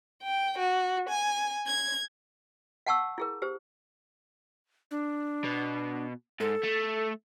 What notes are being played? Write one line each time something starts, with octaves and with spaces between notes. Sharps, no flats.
G5
F#4
G#5
G#6
F5 F#5 A5 C#6 E6
E4 G#4 A#4
G4 C5
D4
B2
G#2 A4
A3